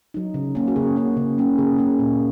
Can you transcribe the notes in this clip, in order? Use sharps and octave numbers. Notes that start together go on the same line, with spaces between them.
F#3 D#4
C#3
A#3 C#4
F#4
C#3 G#4
A#3 C#4
C#3
A#3 C#4
C#3 G#4
A#3 C#4
A#2